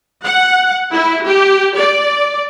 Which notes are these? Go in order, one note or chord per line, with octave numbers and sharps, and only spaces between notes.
F#5
E4
G4
D5